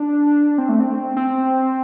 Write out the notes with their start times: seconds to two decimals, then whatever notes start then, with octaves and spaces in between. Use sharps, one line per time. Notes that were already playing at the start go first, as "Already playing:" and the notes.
Already playing: D4
0.58 C4
0.69 A3
0.80 C4
1.17 C4